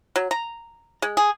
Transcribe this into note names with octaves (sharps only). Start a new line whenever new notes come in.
F#3
A#5
G#3
G#4